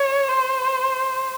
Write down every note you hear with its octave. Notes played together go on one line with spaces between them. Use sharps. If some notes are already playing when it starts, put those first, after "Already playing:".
Already playing: C#5
C5